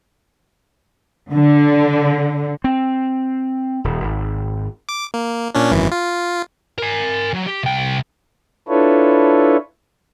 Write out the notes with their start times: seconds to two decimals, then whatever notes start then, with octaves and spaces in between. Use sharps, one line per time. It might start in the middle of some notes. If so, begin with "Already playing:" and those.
1.32 D3
2.64 C4
3.84 D#1
4.04 G#1
4.89 D6
5.14 A#3
5.55 A#2 C#4 D4
5.71 G#1 F#2 E3
5.91 F4
6.78 A#4 G#5
7.34 F#3
7.47 G4
7.64 C2 G5
8.68 D4 E4 F4 A4 B4 C#5